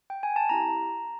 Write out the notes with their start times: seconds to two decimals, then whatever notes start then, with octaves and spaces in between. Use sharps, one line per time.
0.10 G5
0.23 G#5
0.36 A5
0.49 C4 E4 G4 A#5